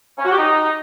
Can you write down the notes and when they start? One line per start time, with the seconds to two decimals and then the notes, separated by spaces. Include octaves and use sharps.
0.18 C#4
0.25 F#4
0.32 G4
0.38 D#4